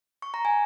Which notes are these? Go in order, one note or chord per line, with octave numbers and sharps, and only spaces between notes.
C#6
A#5
G#5